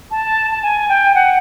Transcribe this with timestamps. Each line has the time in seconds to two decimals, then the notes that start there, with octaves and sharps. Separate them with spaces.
0.11 A5
0.51 A5
0.63 G#5
0.89 G5
1.15 F#5